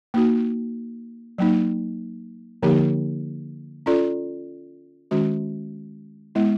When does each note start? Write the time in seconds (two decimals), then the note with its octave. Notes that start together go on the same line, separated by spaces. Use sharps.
0.14 A#3 D#4 F#4
1.38 F#3 A#3 D#4
2.63 D3 F3 A#3 D#4 G4
3.86 C#4 F4 A4 D5
5.11 D#3 G#3 C#4 F#4
6.35 G#3 B3 E4